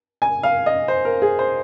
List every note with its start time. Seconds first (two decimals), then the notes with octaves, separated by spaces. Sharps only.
0.22 G#5
0.43 F5
0.66 D#5
0.88 C5
1.05 A#4
1.22 G#4
1.39 C5